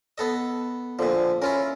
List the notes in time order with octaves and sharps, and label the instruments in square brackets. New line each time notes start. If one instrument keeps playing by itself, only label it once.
[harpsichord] B3 A4 D#5
[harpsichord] A#2 D3 [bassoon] F3
[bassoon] C#4 [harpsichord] E4 F4 A#4